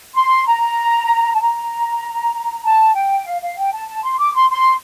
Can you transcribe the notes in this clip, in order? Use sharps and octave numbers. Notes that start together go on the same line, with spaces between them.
C6
A#5
A5
A#5
A5
G5
F5
F5
G5
A5
A5
C6
D6
C6
C6